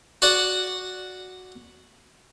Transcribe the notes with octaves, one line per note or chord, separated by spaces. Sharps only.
F#4 D5 F#5